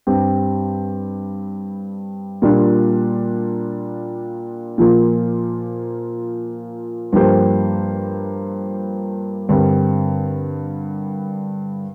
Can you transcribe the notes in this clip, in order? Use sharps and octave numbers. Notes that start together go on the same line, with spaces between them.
G2 G3 C4 G4
A#2 G3 A#3 D4 F4
A#2 F3 A#3 F4
G2 F3 A#3 G4 C5
G2 D3 G3 C4 A#4